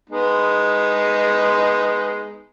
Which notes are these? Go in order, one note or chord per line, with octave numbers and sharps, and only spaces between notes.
G#3 B3 D#4